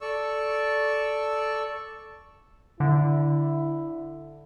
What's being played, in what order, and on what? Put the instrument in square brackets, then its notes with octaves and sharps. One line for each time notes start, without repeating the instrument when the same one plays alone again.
[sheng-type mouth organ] A4 D5 C#6 E6
[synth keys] D3 [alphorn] E4